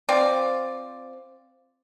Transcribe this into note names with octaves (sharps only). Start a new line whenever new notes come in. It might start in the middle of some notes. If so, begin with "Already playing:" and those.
F3 C4 D5